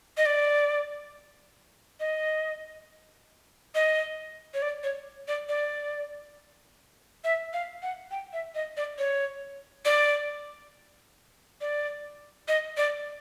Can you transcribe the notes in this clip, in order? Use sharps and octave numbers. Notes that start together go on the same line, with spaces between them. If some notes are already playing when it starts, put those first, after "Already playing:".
D#5
D5
D#5
D#5
C#5
D5
C#5
D5
D5
E5
F5
F#5
G5
E5
D#5
D5
C#5
D5
D5
D#5
D5